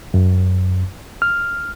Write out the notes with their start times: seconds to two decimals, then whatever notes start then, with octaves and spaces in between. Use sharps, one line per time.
0.14 F#2
1.22 F6